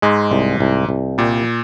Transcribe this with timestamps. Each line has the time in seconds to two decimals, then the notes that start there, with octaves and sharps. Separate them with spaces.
0.02 G#2 G#3
0.31 C2
0.61 C2
0.89 C2
1.18 A#2 G3